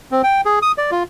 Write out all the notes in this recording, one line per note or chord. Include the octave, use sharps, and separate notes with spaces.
C4
G5
G#4
D#6
D5
F4